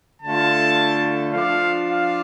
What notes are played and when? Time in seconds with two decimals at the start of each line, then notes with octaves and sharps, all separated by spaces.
0.21 D3 A3 F4 A5
1.33 F3 D4 F4 F5
1.90 F5